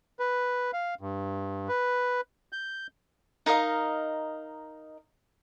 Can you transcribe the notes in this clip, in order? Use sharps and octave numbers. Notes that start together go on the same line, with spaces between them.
B4
F5
G2
B4
G6
D#4 A#4 D#5 F5